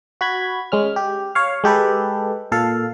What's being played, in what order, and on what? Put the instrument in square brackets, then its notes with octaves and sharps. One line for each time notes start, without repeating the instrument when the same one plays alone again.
[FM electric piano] F#4 B5 G#6
G#3 C#4 F6
G4
C#5 F5
G#3 G4 A4 B4
A#2 A4 F5